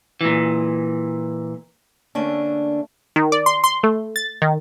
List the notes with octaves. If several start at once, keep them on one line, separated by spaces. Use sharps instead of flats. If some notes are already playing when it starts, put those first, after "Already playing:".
A#2 E3
D3 A3 A#3 C#4 D4
D#3
D5
C6
C6
A3
A6
D#3